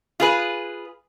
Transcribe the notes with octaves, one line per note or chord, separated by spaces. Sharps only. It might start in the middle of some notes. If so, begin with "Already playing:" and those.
F4 G#4 B4